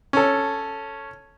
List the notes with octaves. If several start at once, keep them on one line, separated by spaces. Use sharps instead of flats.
C#4 A4